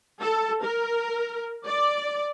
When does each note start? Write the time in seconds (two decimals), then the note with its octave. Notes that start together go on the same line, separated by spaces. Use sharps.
0.21 A4
0.63 A#4
1.66 D5